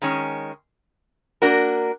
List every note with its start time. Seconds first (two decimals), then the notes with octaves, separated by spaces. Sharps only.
0.02 D#3 G#3 C#4
1.42 A#3 D4 F#4 A#4